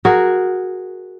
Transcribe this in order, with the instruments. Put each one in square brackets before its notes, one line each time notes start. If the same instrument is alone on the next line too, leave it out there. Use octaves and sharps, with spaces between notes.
[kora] F#4 G#4 A#4